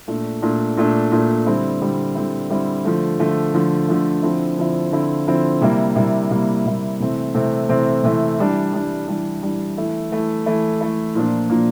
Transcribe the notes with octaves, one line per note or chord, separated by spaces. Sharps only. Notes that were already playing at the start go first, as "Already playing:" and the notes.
A#2 A3 D4
A#2 A3 D4
A#2 A3 D4
A#2 A3 D4
D3 G3 C4 E4
D3 G3 C4 E4
D3 G3 C4 E4
D3 G3 C4 E4
D3 F3 A3
D3 F3 A3
D3 F3 A3
D3 F3 A3
D3 F3 C4 E4
D3 F3 C4 E4
D3 F3 C4 E4
D3 F3 C4 E4
C3 G3 A#3 E4
C3 G3 A#3 E4
C3 G3 A#3 E4
C3 G3 A#3 E4
C3 E3 A3 C4
C3 E3 A3 C4
C3 E3 A3 C4
C3 E3 A3 C4
E3 G3 D4
E3 G3 D4
E3 G3 D4
E3 G3 D4
E3 A3 E4
E3 A3 E4
E3 A3 E4
E3 A3 E4
A#2 F3 A#3 D4
A#2 F3 A#3 D4